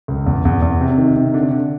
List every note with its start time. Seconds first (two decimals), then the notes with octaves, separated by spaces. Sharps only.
0.08 C#2
0.26 E2
0.45 E2
0.62 E2
0.81 C3
0.98 D#3
1.16 C3
1.34 D3
1.51 D3